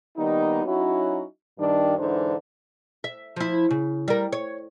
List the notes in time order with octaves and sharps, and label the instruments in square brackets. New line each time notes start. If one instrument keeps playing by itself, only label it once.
[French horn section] D#3 G3 A#3 B3 D#4
F#3 C#4 D#4 E4 F#4
G2 D#3 D4
G#2 D3 E3 D4 D#4 C5
[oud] E5
F3 E4
C#3
G3 A#4
C#5